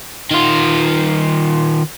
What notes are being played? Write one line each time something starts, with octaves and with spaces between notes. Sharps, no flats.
D#3 F4